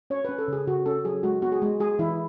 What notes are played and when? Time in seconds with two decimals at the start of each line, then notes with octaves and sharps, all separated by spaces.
0.10 C#4 C#5
0.25 B4
0.29 C#4
0.38 A4
0.48 C#3 G#4
0.67 C#3 F#4
0.86 C#4 A4
1.05 F#3 G#4
1.23 G#3 F#4
1.42 B3 F#4
1.52 G#4
1.62 G#3
1.80 G#3 G#4
1.99 E3 E4